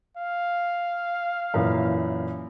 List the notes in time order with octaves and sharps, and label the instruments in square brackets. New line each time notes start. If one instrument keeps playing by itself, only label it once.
[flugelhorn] F5
[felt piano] F#2 A#2 E3